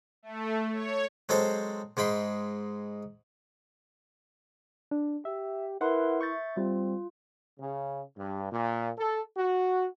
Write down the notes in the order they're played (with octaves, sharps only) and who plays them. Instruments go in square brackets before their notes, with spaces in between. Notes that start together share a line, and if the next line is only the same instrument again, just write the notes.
[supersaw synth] A3
C#5
[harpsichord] F#3 G#3 C4 A4 C5
G#2 G#3 G5 B5 C6
[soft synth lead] D4
[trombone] G4 [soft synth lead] E5
[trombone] E4 [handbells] A#4 B4 C6 [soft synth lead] F#5
[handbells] E5 G6 A6 [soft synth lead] C#6
[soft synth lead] G3 [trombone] C4 [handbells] F4
[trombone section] C#3
G2
A#2
A4
F#4